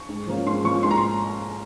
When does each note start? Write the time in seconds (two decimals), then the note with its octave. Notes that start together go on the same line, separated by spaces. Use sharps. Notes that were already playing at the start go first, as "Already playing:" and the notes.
Already playing: C#6
0.09 G#2
0.27 F3 A#3 C#4
0.46 G#2 C6
0.64 F3 A#3 C#4 C#6
0.83 G#2 C6
0.91 A#5
0.97 C6